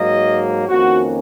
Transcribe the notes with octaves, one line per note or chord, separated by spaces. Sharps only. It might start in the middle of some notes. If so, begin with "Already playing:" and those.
Already playing: G#2 F#3 A#3 D#5
F2 D#3 A#3 C#4 F#4